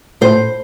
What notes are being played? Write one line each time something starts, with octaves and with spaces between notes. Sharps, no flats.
A2 C5